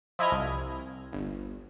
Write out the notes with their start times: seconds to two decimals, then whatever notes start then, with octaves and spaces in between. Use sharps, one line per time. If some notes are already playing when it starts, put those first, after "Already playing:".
0.19 F3 E4 D#5 G#5 F6
0.32 C2
1.13 G1